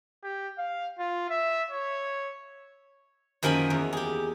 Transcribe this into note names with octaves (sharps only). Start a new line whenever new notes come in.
G4
F5
F4
E5
C#5
F#2 D#3 F3 A#3 G#5 B5
E2
G4 G#4